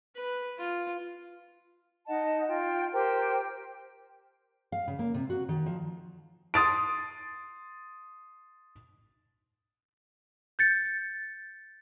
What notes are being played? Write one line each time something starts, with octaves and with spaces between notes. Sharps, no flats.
B4
F4
D#4 D#5 F#5 A5
F4 G5
G4 A#4 C5 G5
F5
C#3
A#3
C3
F#4
D#3
F3
C6 D#6 A6 D7
G6 A6 C#7